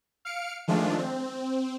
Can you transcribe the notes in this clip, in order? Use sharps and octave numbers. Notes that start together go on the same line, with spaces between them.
F5 F6 C#7 D7
D#3 F3 G#3 A3 D4 F4
C4